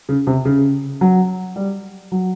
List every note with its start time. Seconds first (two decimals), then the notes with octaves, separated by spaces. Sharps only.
0.09 C#3
0.27 C3
0.45 C#3
1.01 F#3
1.56 G3
2.12 F#3